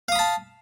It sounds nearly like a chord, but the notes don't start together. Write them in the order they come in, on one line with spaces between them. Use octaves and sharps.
F5 D#6 B5 A5